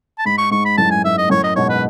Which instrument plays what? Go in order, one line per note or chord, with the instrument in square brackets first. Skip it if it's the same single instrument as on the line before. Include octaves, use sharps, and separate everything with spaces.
[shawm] A5
[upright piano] G#2 [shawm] B5
[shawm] C#6
[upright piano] G#2 [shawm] C#6
[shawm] B5
[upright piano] F#2 A2 [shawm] A5
[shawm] G#5
[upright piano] G#2 [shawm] E5
[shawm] D#5
[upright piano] F#2 A2 [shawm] C#5
[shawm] D#5
[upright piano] G#2 B2 [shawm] C#5
[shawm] B4